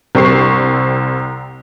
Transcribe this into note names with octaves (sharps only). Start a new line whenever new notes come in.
C2 C4 C#6 C7